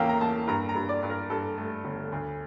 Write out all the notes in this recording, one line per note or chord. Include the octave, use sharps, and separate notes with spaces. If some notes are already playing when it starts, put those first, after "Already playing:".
Already playing: E2 A#3 C#4 E5 F5 G5
A#5
A#3 A5
G2 A#5
A#5
G2
D5
G2
A#4
G2 A4
A3
G1
D2